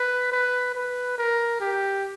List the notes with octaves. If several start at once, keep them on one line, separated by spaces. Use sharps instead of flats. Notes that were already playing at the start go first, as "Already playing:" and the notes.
Already playing: B4
B4
B4
A#4
G4